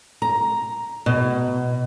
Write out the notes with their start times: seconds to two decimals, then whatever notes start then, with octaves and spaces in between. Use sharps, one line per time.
0.22 A#5
1.06 B2